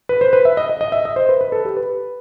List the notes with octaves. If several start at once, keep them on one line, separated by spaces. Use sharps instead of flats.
B4
C5
B4
E5
D#5
D#5
D#5
E5
D#5
C5
B4
B4
A4
G4
B4